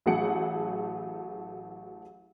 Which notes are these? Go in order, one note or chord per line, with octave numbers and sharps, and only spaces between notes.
A1 F#3 A3 G#4 F#5 C#7